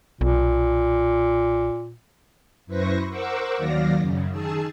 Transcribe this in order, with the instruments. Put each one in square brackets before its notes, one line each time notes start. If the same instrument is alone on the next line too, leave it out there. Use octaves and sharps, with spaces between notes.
[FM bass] B1 [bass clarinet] A#2
[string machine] F#2 E4 B4 C5 C#6 A#6
A#4 C5 F#5 C#6 D6 E6
D#2 D#3 F#3 D5 F5 A#6
F#2 C#3
D#3 G#4 A5 E6